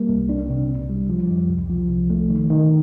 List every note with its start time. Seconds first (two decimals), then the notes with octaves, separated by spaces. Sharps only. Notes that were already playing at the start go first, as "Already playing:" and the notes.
Already playing: G3 A#3
0.09 C2
0.29 D4
0.50 C3
0.69 C2
0.90 G3
1.10 F3
1.29 F2
1.50 C2
1.70 F3
1.90 C2
2.10 A3
2.30 D#3
2.50 D#3